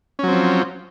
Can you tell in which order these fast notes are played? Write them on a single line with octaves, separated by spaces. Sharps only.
C#4 F#3 C4 F3